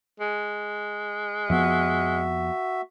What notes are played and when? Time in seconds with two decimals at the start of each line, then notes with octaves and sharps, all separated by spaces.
0.20 G#3
1.49 F2 F3 B3 F#4 E5